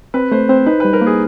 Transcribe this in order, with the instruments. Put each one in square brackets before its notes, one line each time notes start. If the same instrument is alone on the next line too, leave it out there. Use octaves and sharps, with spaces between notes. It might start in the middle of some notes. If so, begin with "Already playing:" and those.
[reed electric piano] C4 [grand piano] B4
[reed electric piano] A3 [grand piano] C5
[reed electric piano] C4 [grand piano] C5
[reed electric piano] D#4 [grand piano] B4
[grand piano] B4
[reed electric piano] G3
[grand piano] A#4
[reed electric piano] A#3
[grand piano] G#4